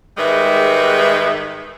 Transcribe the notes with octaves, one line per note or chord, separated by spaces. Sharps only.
G#2 D#3 G3 G#3 B4 E5